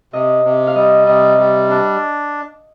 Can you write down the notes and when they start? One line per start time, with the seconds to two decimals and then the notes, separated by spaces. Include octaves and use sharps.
0.13 C3 D#5
0.44 C3
0.67 F5
0.76 G3 D#5
1.07 C3 D#5
1.38 G3
1.69 D4